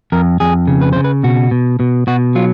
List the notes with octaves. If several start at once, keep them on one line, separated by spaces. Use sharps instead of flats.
F2 A#4
F2 G#4
C#3
B4
C#3 C5
B4
B2 F#4
B2
B2
B2 F#4
F#3 F4